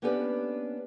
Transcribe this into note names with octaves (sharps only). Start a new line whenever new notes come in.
A#3 B3 C#4 D4 G4 B4